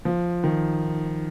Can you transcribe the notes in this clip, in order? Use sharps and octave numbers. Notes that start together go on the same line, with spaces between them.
F3
D#3